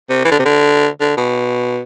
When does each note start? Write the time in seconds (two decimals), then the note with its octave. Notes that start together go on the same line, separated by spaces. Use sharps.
0.09 C3
0.25 E3
0.31 D3
0.39 C3
0.45 D3
1.01 D3
1.17 B2